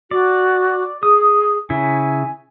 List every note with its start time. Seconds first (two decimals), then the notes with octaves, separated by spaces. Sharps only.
0.11 F#4 D5
1.03 G#4 D#6
1.70 C#3 E4 G#5